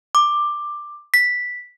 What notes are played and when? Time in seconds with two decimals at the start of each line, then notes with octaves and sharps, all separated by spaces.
0.15 D6
1.14 B6